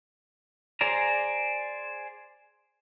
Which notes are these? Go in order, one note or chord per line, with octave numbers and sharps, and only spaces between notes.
G#4 C5 D5 A#5